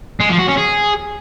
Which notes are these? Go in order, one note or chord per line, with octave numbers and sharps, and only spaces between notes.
G#3
F3
F#4
C#4
G#4